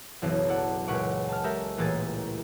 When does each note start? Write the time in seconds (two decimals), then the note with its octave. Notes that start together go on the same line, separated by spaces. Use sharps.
0.22 F#1 B1 E3
0.49 A4 D5 F#5
0.87 C#2 A#2 B4 F#5 C#6 D7
1.29 A5 F6
1.44 G#3 G4 A4 A#4 E5 G5
1.78 A1 A#2 E3 A#3 G#4 A6